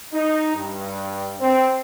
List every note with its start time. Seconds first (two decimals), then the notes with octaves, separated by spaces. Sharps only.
0.13 D#4
0.55 G2
1.39 C4